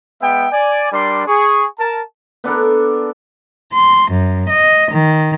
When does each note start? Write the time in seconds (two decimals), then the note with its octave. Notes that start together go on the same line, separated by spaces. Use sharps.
0.21 G#3 B3 E5 G5
0.52 D5 G#5
0.92 G3 D4 A#4 D5 C6
1.28 G#4 C#6
1.79 A#4 A5
2.44 B3 D4 A4 A#4
3.73 C6
4.11 F#2
4.48 D#5
4.92 D#3